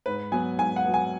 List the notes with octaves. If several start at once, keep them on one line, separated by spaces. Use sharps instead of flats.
G#2 B4
F#3 B3 G#5
G#2 G#5
F#5
F#3 B3
G#5